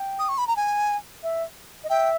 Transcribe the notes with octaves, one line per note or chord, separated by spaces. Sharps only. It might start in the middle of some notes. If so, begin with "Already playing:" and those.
Already playing: G5
D#6
C#6
B5
A#5
G#5
E5
D#5
E5 G5